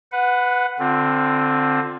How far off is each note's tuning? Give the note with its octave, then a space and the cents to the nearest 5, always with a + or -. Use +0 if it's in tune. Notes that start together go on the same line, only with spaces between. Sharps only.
B4 +10 F#5 -10
D3 +0 C4 +5 F4 +25